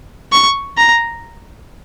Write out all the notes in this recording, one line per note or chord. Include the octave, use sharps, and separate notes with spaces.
C#6
A#5